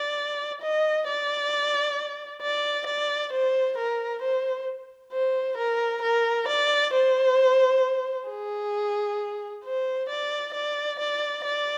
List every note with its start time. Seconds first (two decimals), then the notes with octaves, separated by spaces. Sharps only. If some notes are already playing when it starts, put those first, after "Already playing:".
Already playing: D5
0.62 D#5
1.07 D5
2.42 D5
2.87 D5
3.33 C5
3.78 A#4
4.22 C5
5.12 C5
5.57 A#4
6.02 A#4
6.48 D5
6.94 C5
8.29 G#4
9.64 C5
10.09 D5
10.54 D5
10.99 D5
11.44 D5